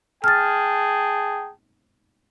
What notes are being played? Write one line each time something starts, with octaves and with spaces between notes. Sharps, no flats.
G#4 G5 A5 F6 A6